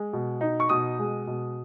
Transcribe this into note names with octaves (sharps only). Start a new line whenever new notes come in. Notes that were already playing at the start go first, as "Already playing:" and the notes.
Already playing: G#3
B2
D#4
C#6
B2 D#6
G#3
B2